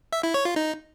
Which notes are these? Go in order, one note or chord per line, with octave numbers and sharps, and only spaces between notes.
E5
E4
C#5
F4
D#4